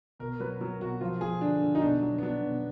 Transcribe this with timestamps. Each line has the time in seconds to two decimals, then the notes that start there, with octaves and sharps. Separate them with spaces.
0.20 B2 A#4
0.40 F#3 B4
0.60 F#3 A#4
0.80 B2 F#4
1.01 F3 F4
1.21 F3 G#4
1.41 D3 D4
1.62 D3
1.75 D#4
1.82 B2 D4
2.02 F#3
2.18 B3
2.22 F#3 D4
2.43 B2